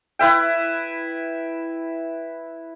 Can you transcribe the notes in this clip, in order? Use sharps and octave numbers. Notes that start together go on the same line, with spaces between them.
E4 B4 E5 G5